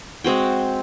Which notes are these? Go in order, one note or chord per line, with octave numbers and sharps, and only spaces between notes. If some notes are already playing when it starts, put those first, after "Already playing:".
G#3 C4 F#4 G5